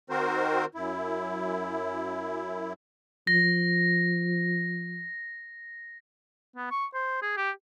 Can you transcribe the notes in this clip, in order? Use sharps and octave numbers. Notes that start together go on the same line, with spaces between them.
D#3 C4 F#4 A#4 C5
F#2 E4
F3 A#6
B3
C#6
C5
G#4
G4